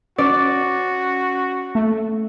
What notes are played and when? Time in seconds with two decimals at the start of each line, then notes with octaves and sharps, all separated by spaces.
0.18 C#4 F#4 D5
1.75 A3